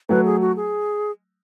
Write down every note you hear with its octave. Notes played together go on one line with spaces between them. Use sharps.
F#3 A3 B4
G#4
F#4
G#4